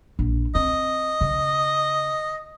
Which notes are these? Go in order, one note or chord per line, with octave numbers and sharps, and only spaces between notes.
A#1
C4 D#5
C#3